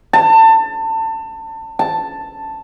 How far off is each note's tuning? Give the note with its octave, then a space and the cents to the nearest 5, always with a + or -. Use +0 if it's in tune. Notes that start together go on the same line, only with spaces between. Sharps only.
A5 +25
A5 +5